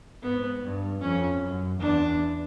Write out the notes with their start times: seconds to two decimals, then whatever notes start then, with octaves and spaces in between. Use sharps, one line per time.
0.22 G#2 B3
0.61 G2
1.01 F2 C#4
1.40 F#2
1.79 E2 D4